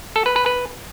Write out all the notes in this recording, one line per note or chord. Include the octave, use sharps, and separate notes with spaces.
A4
B4
B4
B4